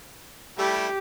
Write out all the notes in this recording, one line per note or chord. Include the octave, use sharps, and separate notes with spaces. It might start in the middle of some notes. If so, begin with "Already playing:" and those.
G3 A3 E4 G4